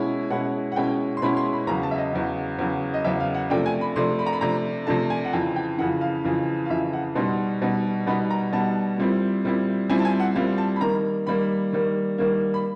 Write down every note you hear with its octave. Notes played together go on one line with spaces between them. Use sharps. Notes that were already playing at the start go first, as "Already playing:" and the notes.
Already playing: B2 G#3 C#4 E4
B2 G#3 C#4 E4 F#5
F#5
B2 G#3 C#4 E4 G5
C6
B2 G#3 C#4 E4 B5
C6
B5
E2 C#3 F#3 A#5
A5
E5
D#5
E2 C#3 F#3
E2 C#3 F#3
D#5
E2 C#3 F#3 E5
F5
F#5
C3 F3 A3 D4 G5
G#5
B5
C3 F3 A3 D4 C6
B5
A#5
B5
C3 F3 A3 D4 A#5
C3 F3 A3 D4 A5
G#5
F#5
F2 C#3 E3 G5
G5
F2 C#3 E3 F#5
F5
F2 C#3 E3
F5
F2 C#3 E3 E5
F#5
B2 G3 B3 D#4 C6
B2 G3 B3 D#4
B2 G3 B3 D#4 B5
A#5
B2 G3 B3 D#4 A5
A#2 G3 C4 E4
A#2 G3 C4 E4
A#2 G3 C4 E4 G#5
A5
G#5
F#5
A#2 G3 C4 E4 F5
A5
B5
D#3 G3 A#3 A#5
D#3 G3 A#3 B5
D#3 G3 A#3
D#3 G3 A#3
B5